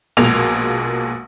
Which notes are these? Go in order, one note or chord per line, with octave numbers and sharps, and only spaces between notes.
A#1 B2 G#3 A#3 F7